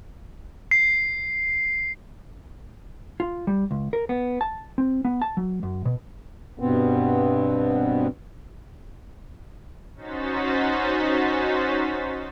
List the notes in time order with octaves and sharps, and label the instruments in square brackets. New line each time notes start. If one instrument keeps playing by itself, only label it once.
[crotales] C7
[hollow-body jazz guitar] F4
G3
C#2
A#4
B3
A5
C4
B3
A5
F#3
F#2
B2
[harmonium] G2 B2 B3 C4
[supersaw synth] C#4 D#4 F#4 C5 A6 B6